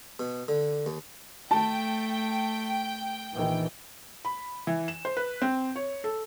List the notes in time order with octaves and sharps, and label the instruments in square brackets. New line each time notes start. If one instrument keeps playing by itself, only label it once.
[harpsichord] B2
D3
D#2
[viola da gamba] A3 [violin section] G5 [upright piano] A5
[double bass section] A#1 D#3 E3
[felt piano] B5
E3
E7
C5
B4
C4
C#5
A4